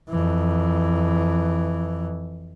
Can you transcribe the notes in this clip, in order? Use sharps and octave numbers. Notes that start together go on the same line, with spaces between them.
F2 E3